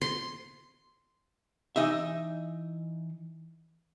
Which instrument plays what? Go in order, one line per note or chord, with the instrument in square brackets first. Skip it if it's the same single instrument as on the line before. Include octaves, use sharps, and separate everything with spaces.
[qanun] C6
[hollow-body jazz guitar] E3 D#4 D#5 E5